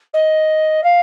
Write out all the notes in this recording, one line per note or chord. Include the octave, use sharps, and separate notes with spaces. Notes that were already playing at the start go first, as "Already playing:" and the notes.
D#5
F5